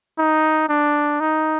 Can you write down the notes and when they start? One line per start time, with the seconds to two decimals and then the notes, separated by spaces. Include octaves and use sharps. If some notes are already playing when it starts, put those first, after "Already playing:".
0.19 D#4
0.69 D4
1.20 D#4